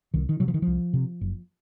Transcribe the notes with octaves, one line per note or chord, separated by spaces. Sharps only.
C2 D#3
D#3
C3 F#3
F3
D#3
C2 F3
C3
F#1